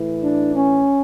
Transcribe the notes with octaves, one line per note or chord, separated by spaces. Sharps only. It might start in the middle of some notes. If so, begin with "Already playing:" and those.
Already playing: A2 E3
D4
C#4